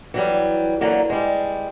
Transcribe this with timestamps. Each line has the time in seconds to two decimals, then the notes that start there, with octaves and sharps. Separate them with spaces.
0.14 E3 F#3 G3
0.81 D3 E3 F#3 A#3
1.10 G3 G#3